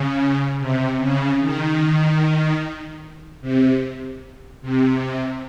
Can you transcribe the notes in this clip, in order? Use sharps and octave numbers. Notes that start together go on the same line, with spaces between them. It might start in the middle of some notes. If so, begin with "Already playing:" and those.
Already playing: C#3
C3
C#3
D#3
C3
C3